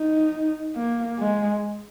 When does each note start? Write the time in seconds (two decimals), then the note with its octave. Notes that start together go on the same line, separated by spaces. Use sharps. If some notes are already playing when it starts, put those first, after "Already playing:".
Already playing: D#4
0.76 A#3
1.18 G#3